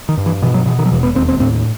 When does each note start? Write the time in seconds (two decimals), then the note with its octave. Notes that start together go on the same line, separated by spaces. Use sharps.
0.09 D#3
0.17 G2
0.26 E3
0.42 B2 E3
0.54 F#3
0.66 B2 E3
0.79 D#3
0.86 F#3
0.92 E1 E3
1.03 B3
1.15 D#2 C4
1.28 C4
1.40 A2 C4